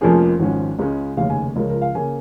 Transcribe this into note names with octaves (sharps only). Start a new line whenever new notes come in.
F1 F2 F3 A#3 C#4 G#4
G#1 G#2 F3 C#4
C#2 C#3 G#3 C#4
F1 D#2 C#3 F5
G#5
C#2 C#3 F3 A#4
A#4
F5
C#3 A#3 G#5